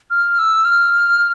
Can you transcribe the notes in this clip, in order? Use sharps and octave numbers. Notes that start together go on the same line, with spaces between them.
F6
E6
F6